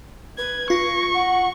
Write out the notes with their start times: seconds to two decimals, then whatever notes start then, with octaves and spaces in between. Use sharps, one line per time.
0.38 B4 G#6
0.70 F4 C#6 A#6
1.14 F#5